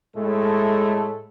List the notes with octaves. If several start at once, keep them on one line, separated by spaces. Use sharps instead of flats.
A2 G#3 A3 A4